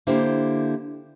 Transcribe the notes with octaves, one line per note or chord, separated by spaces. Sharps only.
D3 A#3 E4 G4 C5